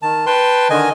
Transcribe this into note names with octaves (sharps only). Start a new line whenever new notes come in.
D#3 A5
B4 G5 A5 C6
D3 D#3 D#5 G#5